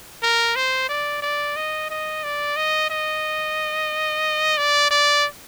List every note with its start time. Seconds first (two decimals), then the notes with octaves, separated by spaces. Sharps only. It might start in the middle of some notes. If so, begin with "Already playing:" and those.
0.23 A#4
0.56 C5
0.89 D5
1.22 D5
1.56 D#5
1.90 D#5
2.24 D5
2.56 D#5
2.90 D#5
4.57 D5
4.91 D5